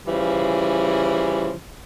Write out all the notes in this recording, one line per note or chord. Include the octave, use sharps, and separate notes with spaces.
C#3 E3 F3 G3